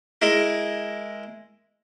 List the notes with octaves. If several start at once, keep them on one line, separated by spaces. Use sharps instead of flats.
G#3 E4 A#4